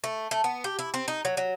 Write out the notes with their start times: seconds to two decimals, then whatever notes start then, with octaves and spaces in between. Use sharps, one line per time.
0.04 A3
0.31 A3
0.44 B3
0.64 G4
0.79 E4
0.94 C4
1.08 D#4
1.25 F#3
1.37 F#3